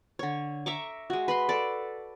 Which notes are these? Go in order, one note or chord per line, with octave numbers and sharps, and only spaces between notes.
D3 C#5
E5 A#5 C#6 D6
G#3 F#4
B4 B5 C6
A4 D5